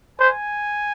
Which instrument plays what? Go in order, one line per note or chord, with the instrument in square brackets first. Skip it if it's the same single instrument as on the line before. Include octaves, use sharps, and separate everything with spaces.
[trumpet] C5 [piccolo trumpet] G#5